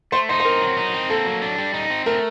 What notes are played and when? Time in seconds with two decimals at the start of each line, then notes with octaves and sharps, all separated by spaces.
0.12 A3 C5
0.29 D#4 C5
0.40 C5
0.45 C4 A#4
0.61 F#3
0.77 D#4
0.94 C4
1.10 A#3 A4
1.26 F#3
1.42 D4
1.58 G3
1.74 D#4
1.90 C4
2.06 A3 A#4